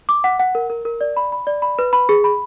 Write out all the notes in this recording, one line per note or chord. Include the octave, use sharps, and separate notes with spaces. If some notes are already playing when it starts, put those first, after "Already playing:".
D6
F#5
F#5
A#4
A#4
A#4
D5
B5
B5
D5
B5
B4
B5
G#4
B5